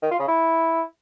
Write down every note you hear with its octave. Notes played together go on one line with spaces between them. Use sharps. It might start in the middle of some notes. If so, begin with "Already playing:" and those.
D#3
F4
C#3
E4